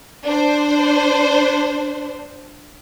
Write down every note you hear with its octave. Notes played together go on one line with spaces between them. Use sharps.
D4 C5